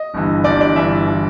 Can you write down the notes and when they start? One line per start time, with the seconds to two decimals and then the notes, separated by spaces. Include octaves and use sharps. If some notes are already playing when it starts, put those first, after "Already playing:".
Already playing: D#5
0.14 G1 G2 E3
0.44 G1 G2 E3 D5
0.61 D5
0.76 G1 G2 E3 E5
1.07 E3